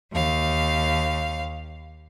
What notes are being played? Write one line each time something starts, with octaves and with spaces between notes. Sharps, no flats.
D#2 F5